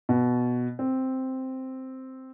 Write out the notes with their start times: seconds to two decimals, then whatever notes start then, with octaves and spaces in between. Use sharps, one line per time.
0.09 B2
0.79 C4